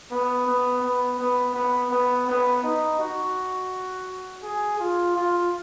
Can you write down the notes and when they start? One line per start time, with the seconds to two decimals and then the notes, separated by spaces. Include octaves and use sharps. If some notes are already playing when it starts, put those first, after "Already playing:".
0.11 B3
0.47 B3
0.82 B3
1.19 B3
1.55 B3
1.91 B3
2.27 B3
2.63 D#4
2.99 F#4
4.43 G#4
4.79 F4
5.16 F4